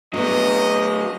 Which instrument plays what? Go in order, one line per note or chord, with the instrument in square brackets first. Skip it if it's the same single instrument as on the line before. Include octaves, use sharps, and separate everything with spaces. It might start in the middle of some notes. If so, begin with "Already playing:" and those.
[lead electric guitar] F#3 A3 [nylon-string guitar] B3 D4 [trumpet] D#5